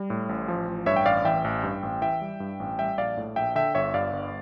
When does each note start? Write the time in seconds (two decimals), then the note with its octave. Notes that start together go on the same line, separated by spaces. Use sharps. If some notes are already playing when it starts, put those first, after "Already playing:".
Already playing: G3
0.10 A2
0.29 A1
0.48 F3
0.67 A1
0.86 G2 C#5 E5
0.96 G5
1.06 A1 D5 F5
1.25 E3 E5 G5
1.44 A1
1.63 G2
1.83 A1
2.02 E3 E5 G5
2.21 G3
2.40 G2
2.60 A1
2.79 G3 E5 G5
2.98 A#1 D5 F5
3.17 A2
3.36 A#1 E5 G5
3.55 D3 E5 G5
3.75 G1 C#5 E5
3.94 G2 D5 F5
4.13 G1